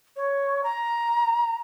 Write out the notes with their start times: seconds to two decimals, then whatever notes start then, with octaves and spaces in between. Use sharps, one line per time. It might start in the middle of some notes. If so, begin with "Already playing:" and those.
0.16 C#5
0.64 A#5